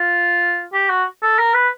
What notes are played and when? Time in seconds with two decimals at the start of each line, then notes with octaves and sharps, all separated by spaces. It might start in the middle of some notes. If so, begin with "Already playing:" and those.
Already playing: F4
0.73 G4
0.90 F#4
1.22 A4
1.39 A#4
1.54 B4